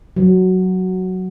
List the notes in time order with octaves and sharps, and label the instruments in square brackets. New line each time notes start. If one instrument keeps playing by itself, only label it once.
[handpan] F#3